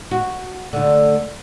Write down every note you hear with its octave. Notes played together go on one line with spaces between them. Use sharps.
F#4
D2 D3